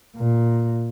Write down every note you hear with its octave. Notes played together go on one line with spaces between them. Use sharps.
A#2